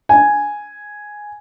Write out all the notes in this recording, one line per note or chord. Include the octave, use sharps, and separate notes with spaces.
G#5